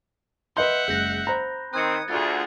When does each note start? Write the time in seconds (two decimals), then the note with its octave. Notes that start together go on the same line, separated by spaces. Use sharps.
0.57 B4 D#5 E5 F#5 C6 G6 G7
0.88 F#1 G#3 F#6 G6 A#6
1.27 C5 A#5 B5 A#6
1.74 D#3 C4 D#6 F#6 G#6 C#7
2.08 D2 F4 G#4 A6